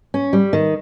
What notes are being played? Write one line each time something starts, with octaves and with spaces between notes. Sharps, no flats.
C#4
G3
D#3